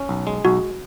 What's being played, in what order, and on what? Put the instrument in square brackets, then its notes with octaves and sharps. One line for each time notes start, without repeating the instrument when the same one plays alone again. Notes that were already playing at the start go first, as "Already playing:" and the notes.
Already playing: [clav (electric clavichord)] C#4
B1
G#3
[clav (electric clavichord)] B1 [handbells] F#4